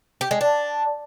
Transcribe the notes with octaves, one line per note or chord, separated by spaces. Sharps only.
G4
G#3
D4